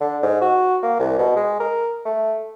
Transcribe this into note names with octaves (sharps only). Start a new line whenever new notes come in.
D3
G#2
F#4
A#3
C2
B2
G#3
A#4
A3